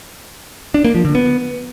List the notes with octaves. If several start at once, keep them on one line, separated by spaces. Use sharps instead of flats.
D4
A#3
F3
D3
B3